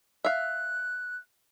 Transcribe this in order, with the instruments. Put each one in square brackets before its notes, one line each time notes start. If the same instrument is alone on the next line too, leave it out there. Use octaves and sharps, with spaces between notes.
[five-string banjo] E5 F5 [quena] F#6